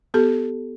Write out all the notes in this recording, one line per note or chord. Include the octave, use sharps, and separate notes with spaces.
B3 G4 A4